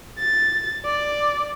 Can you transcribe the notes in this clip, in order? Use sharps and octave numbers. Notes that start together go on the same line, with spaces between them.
A6
D5